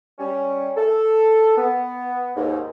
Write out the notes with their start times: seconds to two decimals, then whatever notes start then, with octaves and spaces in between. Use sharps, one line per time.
0.18 G3 C#4
0.77 A4
1.57 B3
2.36 D#2 G#2